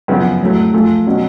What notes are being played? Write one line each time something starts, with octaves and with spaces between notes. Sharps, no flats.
F#2 C#3 F3 B3
A2 F#3 A3
F3 A3 F4 G#4
B2 F#3 C#4